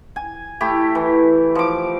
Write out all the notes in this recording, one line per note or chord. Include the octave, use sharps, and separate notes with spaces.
G#5
A3 E4 G4
E3
F3 D6